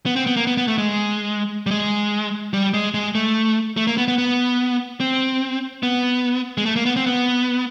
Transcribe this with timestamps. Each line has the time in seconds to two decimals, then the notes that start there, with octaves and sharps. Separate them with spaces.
0.06 B3
0.16 C4
0.27 B3
0.37 A#3
0.47 B3
0.57 B3
0.68 A3
0.78 G#3
1.66 G3
1.71 G#3
2.54 G3
2.74 G#3
2.94 G#3
3.15 A3
3.77 A3
3.87 A#3
3.98 B3
4.08 B3
4.18 B3
5.00 C4
5.83 B3
6.57 G#3
6.66 A3
6.76 A#3
6.86 B3
6.96 C4
7.06 B3